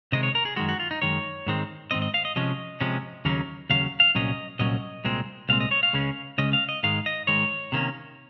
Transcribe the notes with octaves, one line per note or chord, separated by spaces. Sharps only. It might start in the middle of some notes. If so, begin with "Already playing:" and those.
C3 D#3 G#3 D#5
C#5
A#4
G#4
F#2 D#3 G#3 F#4
F#4
F4
D#4
F#2 D#3 G#3 C#5
G#2 D#3 G#3 C4
G#2 D#3 G#3 C4 D#5
D#5
F5
D#5
C3 F3 G#3 C#4 D#5
C3 F3 G#3 C#4
D#2 C#3 F#3 A#3 C#4
D#2 C#3 F#3 C#4 F5
F5
C2 A#2 F#3 C#4 D#5
C2 A#2 F#3 C#4 D#5
C2 A#2 G#3 C4
C2 A#2 G#3 C4 F5
D#5
C#5
F5
C#2 C#3 G#3 C#4
C#2 C#3 G#3 C#4 D#5
F5
D#5
G#2 D#3 G#3 F5
D#5
G#2 D#3 G#3 C#5
C3 D#3 A#3 C#4